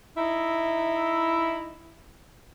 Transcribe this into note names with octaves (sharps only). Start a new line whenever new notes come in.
D#4 E4